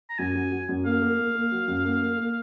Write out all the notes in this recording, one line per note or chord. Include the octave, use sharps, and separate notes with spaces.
A#5
F#2 G#5
F#3
F#3
F#2
A#3 F5
A#3
A#3
A#3
F#3
F#2
A#3
A#3
A#3